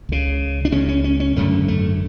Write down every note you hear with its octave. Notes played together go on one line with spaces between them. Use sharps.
C#2 C#3
D4
C#2 C#3 C#4
C#4
C#4
C#4
G#1 F#2 D3 A3
A3